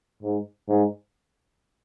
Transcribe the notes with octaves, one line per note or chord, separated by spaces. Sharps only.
G#2
G#2